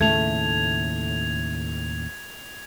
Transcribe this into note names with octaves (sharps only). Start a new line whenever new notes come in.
D#2 A2 C#3 A3 G#6 F7